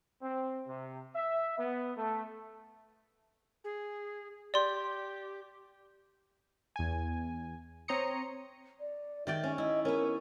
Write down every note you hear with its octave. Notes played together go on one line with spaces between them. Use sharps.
C4
C3
E5
B3
A3
G#4
G4 D5 C6
E2 G#5
C4 C#5 A#5 C6 D#6 C#7
D5
D#3 D5 E5 G5
C#4
E4 D#5
B3 C#4 A#4